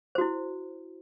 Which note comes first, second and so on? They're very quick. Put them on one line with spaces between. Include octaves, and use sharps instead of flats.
C5 F#4 E4